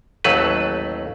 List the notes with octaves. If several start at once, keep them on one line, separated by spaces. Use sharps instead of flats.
A1 D#2 F#3 A3 B4